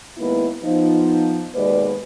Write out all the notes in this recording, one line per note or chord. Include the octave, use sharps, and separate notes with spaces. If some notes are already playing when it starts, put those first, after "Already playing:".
D#2 G#3 A#3 B3 E4 B4
F3 B3 D#4
D#2 B2 G#3 B4 D5